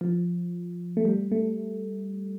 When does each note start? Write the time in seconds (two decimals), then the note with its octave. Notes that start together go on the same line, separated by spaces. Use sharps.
0.01 F3
0.97 A3
1.05 G3
1.32 A3